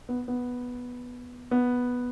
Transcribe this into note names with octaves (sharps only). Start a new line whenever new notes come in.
B3
B3
B3